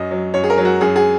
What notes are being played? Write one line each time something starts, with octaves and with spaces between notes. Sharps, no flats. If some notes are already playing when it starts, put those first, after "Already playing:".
Already playing: F#2 F#3 D#5
F#3
F#2 C#5
G#4
A#4
F#3
F#4
F#2 G#4
G#4